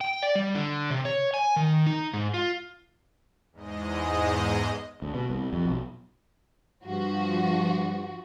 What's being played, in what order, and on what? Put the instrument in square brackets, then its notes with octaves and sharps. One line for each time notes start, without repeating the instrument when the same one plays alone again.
[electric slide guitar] G5
D5
G3
D3
C3
C#5
G#5
D#3
D#4
G#2
F4
[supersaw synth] E2 G#2 G#3 D#5
[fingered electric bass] D2
B2
C2
F2
B1
[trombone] G2 [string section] F3 F#4